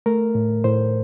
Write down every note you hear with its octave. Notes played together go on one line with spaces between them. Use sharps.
A3 A#4
A2
A2 C5